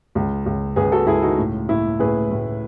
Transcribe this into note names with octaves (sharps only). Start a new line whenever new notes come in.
C#2
C#2
C#2 G#4 B4
F#4 A4
C#2 E4 G#4
D#4 F#4
A2
A2 E4
A2 G#4 B4
A2